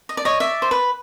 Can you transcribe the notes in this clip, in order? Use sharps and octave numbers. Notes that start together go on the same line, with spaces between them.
D#5
D5
C#5 D#5
D5 E5
C5
B4